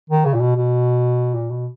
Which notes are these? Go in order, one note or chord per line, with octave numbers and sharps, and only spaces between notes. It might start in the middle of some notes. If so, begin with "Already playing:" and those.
D#3
C#3
A#2
B2
B2
A#2
B2